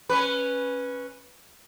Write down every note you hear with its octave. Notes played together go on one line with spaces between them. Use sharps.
C#4 B4